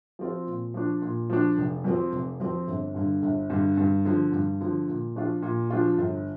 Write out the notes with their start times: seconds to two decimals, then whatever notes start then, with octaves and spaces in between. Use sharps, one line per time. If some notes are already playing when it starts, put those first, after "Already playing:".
0.19 F3 C4 F4
0.47 A#2
0.74 F3 D4
1.02 A#2
1.30 F3 D4
1.57 F1
1.84 F2 F3 C4
2.12 F1
2.40 F2 F3 C4
2.67 G1
2.95 G2 D3
3.22 G1
3.50 G2 D3
3.77 G2
4.05 D3 F3
4.32 G2
4.61 D3 F3
4.88 A#2
5.16 F3 D4 F4
5.42 A#2
5.70 F3 D4 F4
5.98 G1